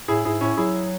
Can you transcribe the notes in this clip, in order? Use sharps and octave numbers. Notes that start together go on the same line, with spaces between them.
A2 E4 G#4
G#2 E4 G#4
A2 C#4 E4
F#3 E4 G#4